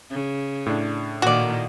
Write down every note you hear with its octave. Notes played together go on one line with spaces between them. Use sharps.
C#3
A2 D4
A#2 D#3 A#3 F#4 D5